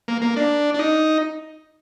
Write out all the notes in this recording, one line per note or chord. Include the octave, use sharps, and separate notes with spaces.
A#3
A#3
D4
D4
D#4